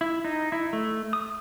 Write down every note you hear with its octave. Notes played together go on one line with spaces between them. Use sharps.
E4
D#4
E4
A3
D#6